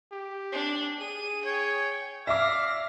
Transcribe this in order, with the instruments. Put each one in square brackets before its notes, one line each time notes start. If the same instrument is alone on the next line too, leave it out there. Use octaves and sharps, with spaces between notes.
[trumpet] G4
[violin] D4
[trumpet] G#4 [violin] D#7
[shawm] C#5 [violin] G5
[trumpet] D5 [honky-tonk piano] E5 D6 [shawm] F5 [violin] A#6